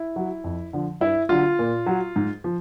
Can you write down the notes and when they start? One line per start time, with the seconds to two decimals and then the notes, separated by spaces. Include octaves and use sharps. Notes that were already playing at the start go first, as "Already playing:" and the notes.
Already playing: E4
0.16 F#3
0.44 F2
0.73 D3 F3
1.01 G2 E4
1.29 D3 F#3 F4
1.59 A#2
1.86 F#3
2.16 G#2
2.44 F3